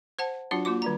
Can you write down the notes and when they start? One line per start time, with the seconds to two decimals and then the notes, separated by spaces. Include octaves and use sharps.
0.19 C5 F#5 A5
0.51 F#3 D4 F4 F#4 F#5
0.65 A#3 F4 F#4 D6
0.82 D#3 G3 A#5